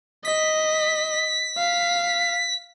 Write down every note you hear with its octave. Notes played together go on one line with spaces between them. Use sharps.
D#5 B6
F5